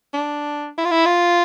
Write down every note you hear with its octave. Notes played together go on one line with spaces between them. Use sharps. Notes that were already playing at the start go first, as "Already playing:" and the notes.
D4
E4
F4
E4
F4